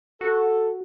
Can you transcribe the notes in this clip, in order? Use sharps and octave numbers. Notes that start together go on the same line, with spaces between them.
F#4 A4